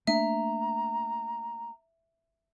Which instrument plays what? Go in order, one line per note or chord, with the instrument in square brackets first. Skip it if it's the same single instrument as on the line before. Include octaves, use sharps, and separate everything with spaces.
[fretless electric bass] A3 A#3 D4 [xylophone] E5 [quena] A#5